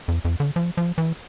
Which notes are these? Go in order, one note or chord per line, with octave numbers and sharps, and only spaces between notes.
F2
F2
D3
F3
F3
E3